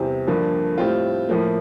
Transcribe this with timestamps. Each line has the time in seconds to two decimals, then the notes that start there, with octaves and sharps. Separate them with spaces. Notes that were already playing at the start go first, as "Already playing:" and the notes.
Already playing: E2 C3 G3 C4
0.27 G2 D3 F3 A#3
0.78 A2 G3 C4 F4
1.29 A2 F3 A#3